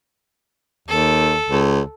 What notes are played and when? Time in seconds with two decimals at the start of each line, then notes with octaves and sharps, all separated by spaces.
0.89 D#2 A4
1.49 C#2